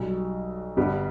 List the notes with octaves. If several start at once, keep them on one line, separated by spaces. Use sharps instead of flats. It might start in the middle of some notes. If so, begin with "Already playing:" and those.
Already playing: B1 B2 G3
G1 G2 G3 B3 G4